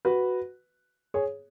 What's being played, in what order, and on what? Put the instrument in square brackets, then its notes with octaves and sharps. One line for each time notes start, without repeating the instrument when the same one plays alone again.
[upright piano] F#4 B4
G#4 C#5